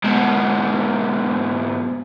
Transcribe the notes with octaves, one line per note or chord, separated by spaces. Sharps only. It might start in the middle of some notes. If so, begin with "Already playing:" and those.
G#2 B2